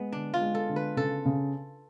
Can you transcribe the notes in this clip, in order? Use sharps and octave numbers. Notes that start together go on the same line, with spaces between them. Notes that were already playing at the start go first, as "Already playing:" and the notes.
Already playing: G#3 B3
D3 D4
F4
G#3
A4
D3
B4
C#3 A4
C#3